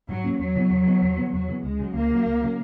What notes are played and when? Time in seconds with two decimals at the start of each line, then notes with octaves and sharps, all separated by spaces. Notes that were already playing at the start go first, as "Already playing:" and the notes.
0.09 G#2 F#3
0.24 E3 A#3 C#4
0.39 E2 F#3
0.55 C#3 E3 B3
0.70 E2
0.86 C#3 E3 B3
1.02 E2
1.17 C#3 E3 B3
1.32 E2 F#3
1.48 C#3 E3 B3
1.63 C#2 G#3
1.79 C#3 F#3
1.94 C#2 A#3
2.10 C#3 F#3
2.26 C#2
2.41 C#3 F#3